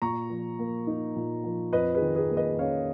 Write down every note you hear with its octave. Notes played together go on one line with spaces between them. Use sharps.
A#2 A#5 C#6
F3
A#3
D#4
A#2
F3
F2 B4 D#5
G#4 B4
D#3
G#4 B4
A#3
B4 D#5
C#4 C#5 F5